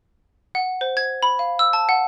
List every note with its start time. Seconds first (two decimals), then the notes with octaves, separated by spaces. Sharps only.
0.55 F#5
0.81 C5
0.97 G#6
1.23 B5
1.39 F5
1.59 E6
1.73 A5
1.89 F#5